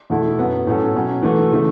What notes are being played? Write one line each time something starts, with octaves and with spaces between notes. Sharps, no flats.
E2 B2 A3 E4 A4
F#2 F#3 B3
A2 F#3 C#4 A4
B2 F#3 C#4
E3 A3 F#4 A4
C#3 E3 A3